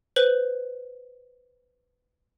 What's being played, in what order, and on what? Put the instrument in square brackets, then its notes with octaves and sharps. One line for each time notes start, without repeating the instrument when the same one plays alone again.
[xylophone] B4 C5 F#7